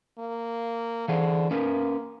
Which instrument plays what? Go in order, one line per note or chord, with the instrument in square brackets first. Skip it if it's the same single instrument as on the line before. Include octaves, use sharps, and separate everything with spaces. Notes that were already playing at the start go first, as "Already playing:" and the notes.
[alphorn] A#3
[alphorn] D3 [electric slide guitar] E3 G#4 C5
[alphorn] A#3 [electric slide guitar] C#4 A#4 B4